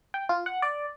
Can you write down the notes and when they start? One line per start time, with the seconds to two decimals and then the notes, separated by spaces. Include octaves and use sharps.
0.14 G5
0.29 F4
0.46 F#5
0.62 D5